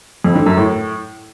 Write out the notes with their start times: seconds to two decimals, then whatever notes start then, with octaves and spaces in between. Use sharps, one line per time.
0.24 F2
0.35 D3
0.46 F#2
0.57 A2